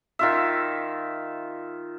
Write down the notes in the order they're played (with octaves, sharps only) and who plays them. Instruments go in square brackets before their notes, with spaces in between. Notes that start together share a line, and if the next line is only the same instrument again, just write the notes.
[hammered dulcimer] D#3 F4 E5